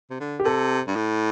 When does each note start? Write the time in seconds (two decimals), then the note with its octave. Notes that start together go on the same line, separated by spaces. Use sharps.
0.10 C3
0.20 D3
0.40 G4
0.44 C3 A4
0.87 G2
0.96 A2